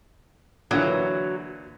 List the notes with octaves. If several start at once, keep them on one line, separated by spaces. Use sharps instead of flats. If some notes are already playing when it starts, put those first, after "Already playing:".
A#2 D3 E3 F#3